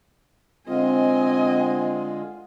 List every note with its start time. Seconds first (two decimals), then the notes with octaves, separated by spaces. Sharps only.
0.68 D3 G#3 C4 F4 D#5 G#5